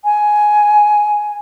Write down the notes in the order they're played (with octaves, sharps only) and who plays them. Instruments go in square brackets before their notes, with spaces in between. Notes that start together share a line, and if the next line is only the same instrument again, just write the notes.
[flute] G#5